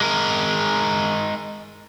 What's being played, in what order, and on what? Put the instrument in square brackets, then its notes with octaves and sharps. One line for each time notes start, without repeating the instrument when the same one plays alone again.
[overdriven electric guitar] G#3 A#4